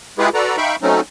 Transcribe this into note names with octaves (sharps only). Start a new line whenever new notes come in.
G#3 E4 F4 G4 G#4 B4
F#4 A4 B4 D5 A#5
D#4 E5 F5 G5 B5 C#6
F#3 A3 C4 C#4 D#4